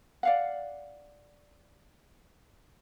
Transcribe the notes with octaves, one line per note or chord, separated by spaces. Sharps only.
D5 F5 F#5